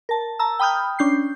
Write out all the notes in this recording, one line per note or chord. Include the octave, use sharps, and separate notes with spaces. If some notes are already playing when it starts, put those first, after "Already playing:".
A#4 A5
A5 A#5 E6
G5 B5 D#6 F6 G6
C#4 D4 G6 C7